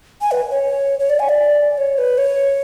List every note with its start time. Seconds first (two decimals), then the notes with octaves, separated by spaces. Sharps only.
0.21 G#5
0.31 B4
0.51 C#5
0.99 C#5
1.10 D5
1.20 G#5
1.29 D5
1.78 C#5
1.98 B4
2.18 C#5